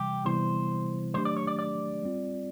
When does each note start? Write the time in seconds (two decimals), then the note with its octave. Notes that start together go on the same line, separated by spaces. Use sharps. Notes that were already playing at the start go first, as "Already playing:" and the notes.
Already playing: C3 E3 G3 G4
0.25 C3 E3 G3 B3 E4 C5
1.14 D#3 F#3 A3 D4 G4 C5
1.25 D5
1.37 C#5
1.47 D5
1.59 D5
2.02 G3 C4 F4